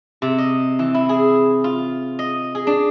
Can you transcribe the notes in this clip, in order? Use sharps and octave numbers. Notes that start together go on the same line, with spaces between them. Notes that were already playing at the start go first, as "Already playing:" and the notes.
C3
D#5
E3
E4
G#4
F4
D#5
G#4
D4